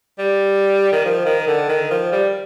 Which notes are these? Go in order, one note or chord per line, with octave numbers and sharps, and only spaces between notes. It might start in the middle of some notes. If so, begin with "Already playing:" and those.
G3
D#3
F3
D#3
D3
D#3
F3
G3